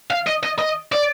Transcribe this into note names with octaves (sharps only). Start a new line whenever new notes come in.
F5
D#5
D#5
D#5
D5